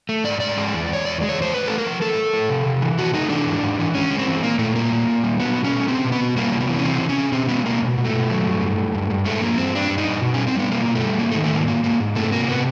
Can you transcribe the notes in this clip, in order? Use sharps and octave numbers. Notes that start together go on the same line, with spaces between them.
A3
G#2 D5
G#2 D5
G#3
E2
E2 C#5
E2 D5
G#3
C#5
E2 C5
A2 B4
A3 A4
A#4
F3
A2 A4
A3
A2
C3
C3
E3
C3 F#4
A3 D#4
E3 D4
G#2
G#2
E3
G#3 C#4
G#3
C4
E3
A#2 A#3
A#2 A3
G3 A#3
A#2
A#2
G3
F#3 B3
B2
C#4
A3
B2 C4
B2
B3
B2
G3 A#3
C3
B3
E3
C#4
C3 C4
C3
C#4
C3
B2 C4
G#3 B3
B2 A#3
B2
B2
A3
B2
F#3
G2
G2
G2
G2
G2
G#3 A3
F3 A#3
G2 C4
G2 D4
G2
D#4
G2
B2
G3 C#4
C4
G3 B3
B2 A#3
B2
A3
G3
G#2 A#3
A3
D#3
A3
G#2 A#3
G#2 A#3
G#2 A#3
G#2
C3 A3
C3 A#3
C3 B3